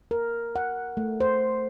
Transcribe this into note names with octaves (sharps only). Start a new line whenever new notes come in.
A#4
F#5
A3
C5